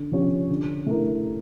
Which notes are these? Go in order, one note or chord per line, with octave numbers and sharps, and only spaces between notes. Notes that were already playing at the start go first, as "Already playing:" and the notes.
Already playing: D3
F3 C#4 G4 C#5
D3
A3 E4 A#4